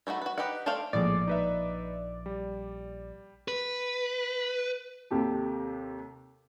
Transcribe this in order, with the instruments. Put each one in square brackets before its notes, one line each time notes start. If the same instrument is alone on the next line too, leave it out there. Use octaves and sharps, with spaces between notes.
[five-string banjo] E3 A3 D#4 F#4 B5
F#4 B4
D#4 G4 B4 D#5 F#5
A3 A4 C5 D5 F5
[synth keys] A#1 D5 [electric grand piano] A2 G#3
[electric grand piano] D#4 B4 E5
G3
[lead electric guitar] B4
[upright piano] D#2 C3 G4 A4